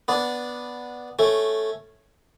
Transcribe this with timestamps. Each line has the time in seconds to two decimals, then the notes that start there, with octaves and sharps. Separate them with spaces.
0.08 B3 D4
1.19 A3 C#4